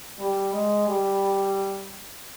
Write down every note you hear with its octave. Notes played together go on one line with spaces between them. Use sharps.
G3
G#3
G3